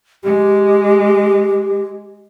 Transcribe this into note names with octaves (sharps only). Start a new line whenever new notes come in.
G#3 G4